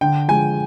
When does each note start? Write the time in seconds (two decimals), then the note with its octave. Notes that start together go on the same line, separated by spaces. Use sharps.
0.01 D3 G5
0.28 F3 G#3 G#5